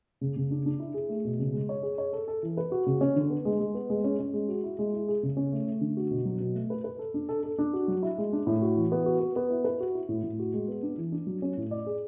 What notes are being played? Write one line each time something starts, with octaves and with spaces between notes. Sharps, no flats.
C#3
C#3
D4
D4
E4
G#4
A3
B2
C#3
G#3
C#5
G#4
C#5
A4
A4
E3
B4
F#4
C#3
C#4
D3
B3
G#3
G#3
B3
G#3
C#4
C#4
G#3
F#4
E4
G#3
E4
G#4
C#3
C#4
A3
A3
D3
F#4
B2
F#3
B2
A3
B4
B4
A4
D4
A4
A4
D4
F#4
F#3
E4
G#3
D4
A2
F#4
E3
B3
F#4
B3
B3
E4
B4
F#4
E4
A2
A2
F#4
G#3
B3
D4
E3
D4
F#3
C#4
A2
D5
G#4